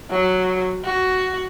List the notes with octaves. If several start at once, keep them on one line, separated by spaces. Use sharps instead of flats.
F#3
F#4